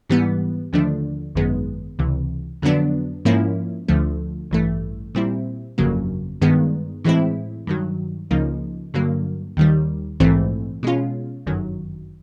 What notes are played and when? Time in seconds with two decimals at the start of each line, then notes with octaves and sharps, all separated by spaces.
0.10 G#2 E3 G3 B3
0.73 D#2 D3 F3 A3 D4
1.35 G#1 F#2 D#3 G#3 B3
1.99 C#2 C3 E3
2.62 F2 D3 F#3 B3 D4
3.25 G#2 F3 A#3 C#4 E4
3.88 D2 D3 F3 A3
4.51 A1 G2 E3 A3
5.15 A#2 G3 C4 E4
5.78 G1 F2 C#3 F#3 A#3
6.41 G2 D#3 G#3 B3
7.04 A2 E3 G#3 C4 E4
7.67 G2 D#3 F#3
8.31 C#2 C#3 F3 A#3 D#4
8.94 G2 D3 F#3 A#3
9.57 D#2 D#3 G3
10.20 A#1 G#2 E3 A3 C4
10.83 B2 G#3 C#4 F4
11.47 G1 F#2 D#3 F#3